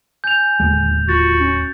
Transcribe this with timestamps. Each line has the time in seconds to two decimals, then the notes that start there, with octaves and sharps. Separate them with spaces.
0.24 G#5 G6 F7
0.60 D1 D#2 G#3
1.09 F4 F#4 A6
1.40 C#4